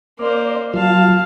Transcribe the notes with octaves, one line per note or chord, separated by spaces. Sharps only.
A#3 C5 D5
F#3 F4 F5 A5